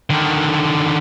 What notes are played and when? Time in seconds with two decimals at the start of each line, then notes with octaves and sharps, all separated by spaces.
0.10 D3 D#3